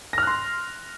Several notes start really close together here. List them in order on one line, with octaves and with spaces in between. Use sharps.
A#6 F6 F#6 C6